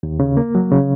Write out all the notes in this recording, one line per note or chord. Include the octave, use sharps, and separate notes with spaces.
D#2
C#3
A#3
F#3
C#3